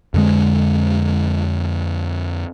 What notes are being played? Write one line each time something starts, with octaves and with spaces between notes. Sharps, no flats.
F2 D3 G#3